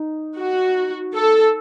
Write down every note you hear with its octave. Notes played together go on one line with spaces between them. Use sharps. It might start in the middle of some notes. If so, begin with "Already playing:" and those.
Already playing: D#4
F#4
A4